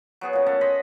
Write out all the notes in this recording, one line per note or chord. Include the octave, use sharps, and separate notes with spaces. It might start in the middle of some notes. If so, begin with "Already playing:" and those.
F#3 B3 G#4
A#2 C#3
B3 C#4 A4 F#5
C5 D#5 B5